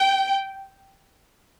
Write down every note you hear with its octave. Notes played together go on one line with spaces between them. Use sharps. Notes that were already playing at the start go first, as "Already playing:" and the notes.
Already playing: G5